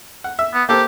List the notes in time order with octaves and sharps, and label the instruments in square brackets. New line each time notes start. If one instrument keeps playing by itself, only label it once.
[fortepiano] F#5
E5
[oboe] B3
[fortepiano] A#3 A4 C5 [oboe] G4